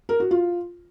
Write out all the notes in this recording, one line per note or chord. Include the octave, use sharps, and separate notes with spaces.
A#4
F#4
F4